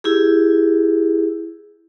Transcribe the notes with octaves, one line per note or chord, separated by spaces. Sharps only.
E4 G4 G#4